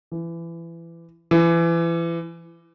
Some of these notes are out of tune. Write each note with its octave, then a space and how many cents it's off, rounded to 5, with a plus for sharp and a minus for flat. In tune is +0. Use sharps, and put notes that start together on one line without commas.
E3 +25
E3 +30